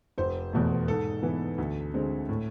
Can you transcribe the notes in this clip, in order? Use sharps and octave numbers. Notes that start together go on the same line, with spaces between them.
F1 C5
E2 B2 A3
G#2 A4
E3 B3
D2
D3 G#3 C4
A2